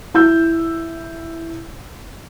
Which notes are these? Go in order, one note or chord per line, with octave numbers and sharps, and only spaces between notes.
E4 E6 G6